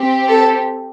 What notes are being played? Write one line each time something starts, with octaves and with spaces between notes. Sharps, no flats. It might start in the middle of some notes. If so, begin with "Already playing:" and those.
Already playing: C4 G4
A4